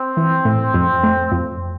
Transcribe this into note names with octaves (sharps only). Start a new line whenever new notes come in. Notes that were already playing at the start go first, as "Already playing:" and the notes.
Already playing: C4
E3
A2
F2
A3
F2